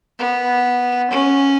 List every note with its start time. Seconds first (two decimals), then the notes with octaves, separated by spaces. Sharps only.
0.19 B3
1.10 C#4